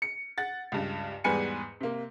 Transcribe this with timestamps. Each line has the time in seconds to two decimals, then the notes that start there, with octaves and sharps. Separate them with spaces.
0.02 C#7
0.38 F#5 A6
0.72 C#2 G2
1.24 E2 G#2 G3 B4 G#5 C#7
1.81 C3 A#3